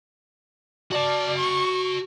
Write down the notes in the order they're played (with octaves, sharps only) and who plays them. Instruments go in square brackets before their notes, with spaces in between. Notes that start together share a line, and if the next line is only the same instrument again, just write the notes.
[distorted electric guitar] F#4 A5 [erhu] D5
[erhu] C#6